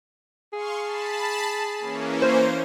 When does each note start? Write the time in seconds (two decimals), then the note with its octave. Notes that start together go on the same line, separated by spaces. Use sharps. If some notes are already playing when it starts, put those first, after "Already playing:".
0.53 G#4 F5 C6 C#6
0.82 A5 B5
1.79 E3 A#3 C#4
2.22 C5